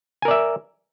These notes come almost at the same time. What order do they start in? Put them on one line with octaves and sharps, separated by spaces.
G#5 A#4 D5 E5